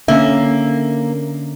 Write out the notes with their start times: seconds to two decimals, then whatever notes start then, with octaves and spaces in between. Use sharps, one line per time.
0.08 D3 A#3 C#4 E5